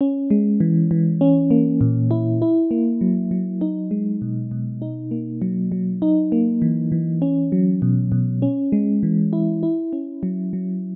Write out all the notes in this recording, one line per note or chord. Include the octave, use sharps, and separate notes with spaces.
C#4
G#3
E3
E3
C#4
A#3
A#2
E4
E4
A#3
F#3
F#3
D#4
G#3
B2
B2
D#4
A#3
F#3
F#3
D#4
A#3
E3
E3
C#4
F#3
B2
B2
C#4
G#3
E3
E4
E4
C#4
F#3
F#3